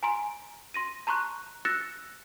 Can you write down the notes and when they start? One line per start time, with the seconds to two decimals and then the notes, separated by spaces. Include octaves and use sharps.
0.03 G#5 A#5 C6 D7
0.74 C6 A#6 D#7
1.07 A5 A#5 C6 C#6 F#6
1.65 E6 F#6 A6 A#6 C#7 E7